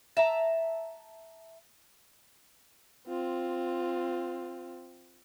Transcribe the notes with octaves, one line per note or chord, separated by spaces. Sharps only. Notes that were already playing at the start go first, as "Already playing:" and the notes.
E5 A5 A#5
C4 F4